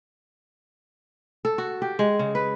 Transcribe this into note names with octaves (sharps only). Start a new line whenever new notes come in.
A4
F#4
G4
G#3
C#3
B4